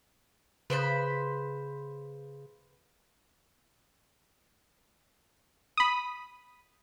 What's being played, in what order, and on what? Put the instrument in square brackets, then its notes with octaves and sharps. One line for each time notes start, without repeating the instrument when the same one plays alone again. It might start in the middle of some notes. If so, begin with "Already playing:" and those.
[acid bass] C#3 [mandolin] B4 C5 B5
[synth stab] B5 D#6